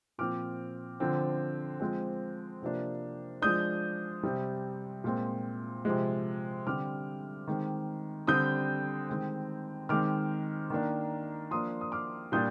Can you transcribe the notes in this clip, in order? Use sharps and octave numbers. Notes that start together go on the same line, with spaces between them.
A#2 F3 C4 D6 F6
D3 F3 C4
F3 G#3 C4
C3 F3 A#3 D4
F3 G#3 D4 D#6 G6
C3 G3 C4
A#2 G#3 C4
C3 F3 G#3
D3 G3 C4 D6 F6
D#3 G#3 C4
D3 G3 C4 D#6 G6
D#3 G#3 C4
D#3 G#3 C4 D6 F6
D#3 A#3 D4
F3 A#3 D4 C6 D#6
D#6
D6 F6
A#2 G3 D4 D#6 G6